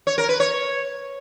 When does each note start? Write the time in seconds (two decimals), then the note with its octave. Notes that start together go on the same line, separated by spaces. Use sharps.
0.07 C#5
0.18 A#4
0.29 B4
0.40 C#5